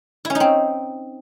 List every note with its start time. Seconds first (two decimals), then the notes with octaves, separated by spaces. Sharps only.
0.25 E4
0.30 C#4
0.35 D#4
0.40 C4